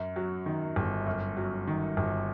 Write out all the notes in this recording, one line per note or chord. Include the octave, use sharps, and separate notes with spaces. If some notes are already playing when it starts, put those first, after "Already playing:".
Already playing: F#2
F#3
D#3
G1
F#2
F#3
D#3
G1